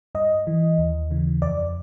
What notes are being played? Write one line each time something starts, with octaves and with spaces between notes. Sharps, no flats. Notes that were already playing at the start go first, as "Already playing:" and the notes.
G2 D#5
E3
D#2
C#3 E3
F2 D5